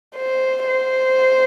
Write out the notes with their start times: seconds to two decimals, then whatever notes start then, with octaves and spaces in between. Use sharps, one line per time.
0.16 C5
0.67 C5